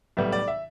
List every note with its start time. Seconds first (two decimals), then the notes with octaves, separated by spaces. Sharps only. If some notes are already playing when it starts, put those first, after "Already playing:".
0.17 B1 A2 G3 B3 E5
0.32 D5
0.48 E5